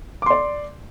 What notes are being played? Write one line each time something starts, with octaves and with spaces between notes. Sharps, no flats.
D5 C6 D6